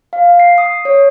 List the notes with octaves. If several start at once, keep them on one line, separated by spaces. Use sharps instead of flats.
F5
C7
D#6
C#5